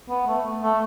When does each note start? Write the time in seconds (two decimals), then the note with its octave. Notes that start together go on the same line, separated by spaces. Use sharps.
0.09 B3
0.27 A3
0.62 A3